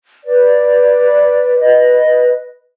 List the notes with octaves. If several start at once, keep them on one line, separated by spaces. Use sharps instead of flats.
B4 D5
B4 D#5